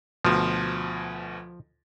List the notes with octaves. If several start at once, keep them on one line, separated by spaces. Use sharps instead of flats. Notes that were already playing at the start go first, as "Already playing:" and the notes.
D2 B2 F3